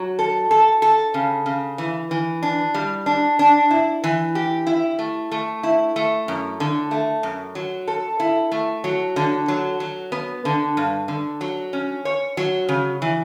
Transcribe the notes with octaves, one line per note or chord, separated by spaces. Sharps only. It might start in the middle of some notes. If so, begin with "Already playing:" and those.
Already playing: F#3
A4
A4
A4
C#3
C#3
E3
E3
D4
G3
D4
D4
E4
E3
G4
E4
A3
A3
E4
A3
F#2
D3
A3
F#2
F#3
A4
E4
A3
F#3
D3
F#3
F#3
B3
D3
G2
D3
F#3
C#4
C#5
F#3
C#3
E3